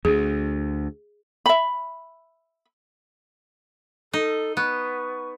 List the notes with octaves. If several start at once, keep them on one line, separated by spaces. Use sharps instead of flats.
D2 G#4
E5 B5
D#4 A4
B3 C#6